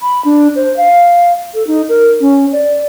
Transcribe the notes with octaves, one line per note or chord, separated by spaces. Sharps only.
B5
D4
C5
F5
A4
D#4
A#4
C#4
D5